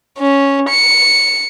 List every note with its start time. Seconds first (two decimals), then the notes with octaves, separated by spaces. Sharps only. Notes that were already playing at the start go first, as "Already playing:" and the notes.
0.19 C#4
0.69 C#7